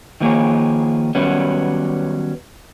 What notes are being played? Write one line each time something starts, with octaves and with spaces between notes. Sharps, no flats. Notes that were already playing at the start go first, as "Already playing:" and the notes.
D#3 F3 A#3 G#4 C#5
D#3 F#3 G3 B3 C#4